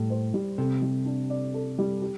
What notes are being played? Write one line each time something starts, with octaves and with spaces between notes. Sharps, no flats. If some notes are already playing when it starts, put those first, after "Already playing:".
Already playing: A2 G3
C5
G3
C3 A4
G3
D4
D5
A4
G3
G4